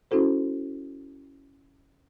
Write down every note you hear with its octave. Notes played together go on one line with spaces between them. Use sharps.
C#4 E4 F#4 A4 C5